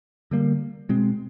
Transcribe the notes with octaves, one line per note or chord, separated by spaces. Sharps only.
D3 G3 A#3
B2 G#3 C4